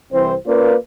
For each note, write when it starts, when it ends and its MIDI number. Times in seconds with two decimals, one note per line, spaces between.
0.12 0.34 36
0.12 0.34 52
0.12 0.34 60
0.12 0.34 72
0.46 0.74 58
0.46 0.74 61
0.46 0.74 65
0.46 0.74 70
0.46 0.74 71
0.46 0.74 74